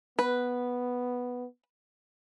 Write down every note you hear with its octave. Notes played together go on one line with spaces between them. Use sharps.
B3 B4